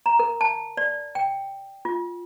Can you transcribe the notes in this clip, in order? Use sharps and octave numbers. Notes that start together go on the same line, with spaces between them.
A#5
A#4
A5
D5
G5
F4